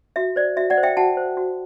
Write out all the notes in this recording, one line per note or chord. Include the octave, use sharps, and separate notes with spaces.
F#4 E5
C5 D5
F#4 E5
D5 F#5
C5
E5 G5
F#4 F#5 A5
C5
F#4